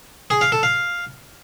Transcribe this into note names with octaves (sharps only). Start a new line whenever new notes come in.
G#4
F5
A4
F5